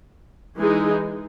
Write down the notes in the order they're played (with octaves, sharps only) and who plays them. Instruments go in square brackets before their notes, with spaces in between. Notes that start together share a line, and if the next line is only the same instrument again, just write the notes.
[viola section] E3 G#3 D#4 G#4